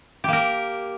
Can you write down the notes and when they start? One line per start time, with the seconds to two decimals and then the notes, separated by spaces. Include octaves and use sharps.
0.24 G4
0.28 A#3
0.33 A#4